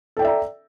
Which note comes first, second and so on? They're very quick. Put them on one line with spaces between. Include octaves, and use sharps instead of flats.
A4 G5 D5 E5 A#5